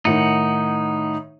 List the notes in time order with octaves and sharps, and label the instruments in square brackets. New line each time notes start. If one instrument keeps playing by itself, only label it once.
[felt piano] A2 D#3 [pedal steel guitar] D#4 F#5